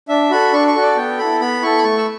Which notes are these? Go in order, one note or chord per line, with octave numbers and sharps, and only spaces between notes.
D4 E5
F#4 A4 B5
D4 C#6
C#6
F#4 A4
D5
B3 G5
E4 A4 B5
B3 B5
E4 A4 C#6
B5
A3 C#6
E6